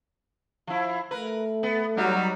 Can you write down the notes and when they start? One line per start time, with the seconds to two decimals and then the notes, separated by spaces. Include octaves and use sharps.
0.67 F3 E4
1.11 A3 A#4 B4
1.63 B3
1.97 F#3 G3 D#4